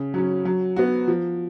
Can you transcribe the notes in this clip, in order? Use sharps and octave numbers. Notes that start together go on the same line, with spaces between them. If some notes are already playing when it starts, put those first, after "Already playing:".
Already playing: C#3
F#3 C#4
F#3
B3 F#4
F3